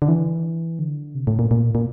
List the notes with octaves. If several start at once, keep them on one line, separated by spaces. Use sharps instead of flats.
D3
E3
D3
C3
A2
A#2
A#2
A#2